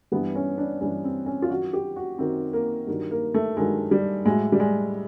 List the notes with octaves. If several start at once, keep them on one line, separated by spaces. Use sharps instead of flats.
G2 E3 G3 B3
C#4
D4
G2 E3 G3 C#4
C4
C#4
F4
F#2 D#3 F#3 F#4
G4
F#4
F#2 D#3 F#3 C4
A#3
G2 D#3 F#3
A#3
A3
G2 D#3 F#3 G#3
G3
A2 F#3 G#3
G3
G#3